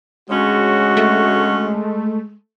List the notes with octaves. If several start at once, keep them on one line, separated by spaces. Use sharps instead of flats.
D2 C#3 G#3 C#4 F#4
A3